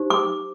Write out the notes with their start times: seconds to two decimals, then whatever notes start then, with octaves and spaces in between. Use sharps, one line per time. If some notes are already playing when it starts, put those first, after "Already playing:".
Already playing: D#4 G4 C5
0.10 D6